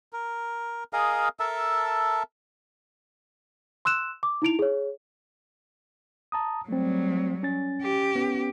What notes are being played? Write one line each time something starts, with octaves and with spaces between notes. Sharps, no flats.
A#4
G#4 A#4 D#5 F5
A4 A#4 E5 A5
C6 E6 F#6 E7
D6
D#4 E4 D7 F7
G#4 C#5
A5 A#5 D#6
F#3 G3 A3 C4
C#4 G#5 A6
G4
B3 C#4